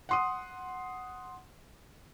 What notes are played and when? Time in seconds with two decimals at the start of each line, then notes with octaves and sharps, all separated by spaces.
0.09 F#5 C6 D#6